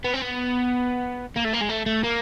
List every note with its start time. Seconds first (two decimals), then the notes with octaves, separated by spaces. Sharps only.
0.05 B3
0.14 C4
0.22 B3
1.37 A#3
1.45 A3
1.54 A#3
1.62 G#3
1.69 A3
1.86 A3
2.03 A#3